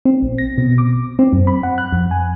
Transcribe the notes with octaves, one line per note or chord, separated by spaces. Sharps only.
C4
A#1
A#6
B2
D6
C4
F#2
B5
F#5
F#6
F2
G#5